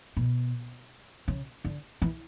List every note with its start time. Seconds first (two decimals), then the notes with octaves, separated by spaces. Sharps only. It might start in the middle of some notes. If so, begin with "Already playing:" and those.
0.17 B2
1.28 C#3
1.65 D3
2.02 E3